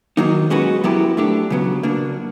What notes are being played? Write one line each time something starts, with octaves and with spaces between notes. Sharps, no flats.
D#3 F#3 A#3 D#4
G#3 C#4 F#4 B4
F#3 B3 E4 G4 A#4
A3 D4 G4
C#3 F#3 B3
C#3 F#3 A#3 D4